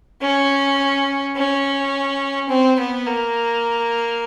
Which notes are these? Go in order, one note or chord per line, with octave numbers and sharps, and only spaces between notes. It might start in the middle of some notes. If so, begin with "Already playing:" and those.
C#4
C#4
C4
B3
A#3